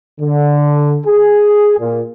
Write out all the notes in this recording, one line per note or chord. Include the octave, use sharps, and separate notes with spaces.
D3
G#4
A#2